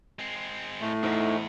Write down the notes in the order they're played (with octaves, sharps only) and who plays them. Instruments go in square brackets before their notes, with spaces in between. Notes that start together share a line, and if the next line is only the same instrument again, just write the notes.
[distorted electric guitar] G#3 C4
[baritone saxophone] A2 [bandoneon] A3
[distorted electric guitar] E2 [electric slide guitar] D#4 C5